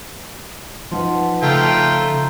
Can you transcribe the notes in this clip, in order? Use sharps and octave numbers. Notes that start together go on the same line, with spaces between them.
F3 D#4 B4 F#5 C6
C#3 A3 F4 G5 A#5 C6